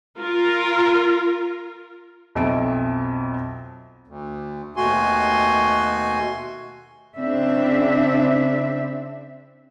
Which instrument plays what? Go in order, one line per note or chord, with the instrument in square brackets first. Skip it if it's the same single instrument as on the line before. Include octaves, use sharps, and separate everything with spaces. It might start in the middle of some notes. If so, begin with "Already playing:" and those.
[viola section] F4 A#4
[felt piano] B1 F2 E5 A5 D7
[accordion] D2
D#2 B2 A3 F#4 G#5 C6
[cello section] C#3 C4 D4 E4 E5